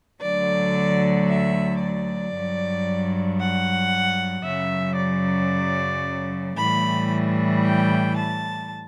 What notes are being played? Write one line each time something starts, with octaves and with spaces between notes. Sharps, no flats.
D2 D3 F#3 D5
E5
D5
G2 F#3
F#5
F#2 C#3 F#3 E5
D5
A2 E3 G3 B5
G5
A5